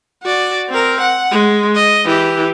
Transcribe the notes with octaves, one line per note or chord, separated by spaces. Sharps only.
F#4 D5
C4 A#4
F#5
G#3
D#5
E3 G4